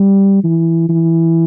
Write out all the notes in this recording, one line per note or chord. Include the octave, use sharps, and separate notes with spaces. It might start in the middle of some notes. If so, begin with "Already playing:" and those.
Already playing: G3
E3
E3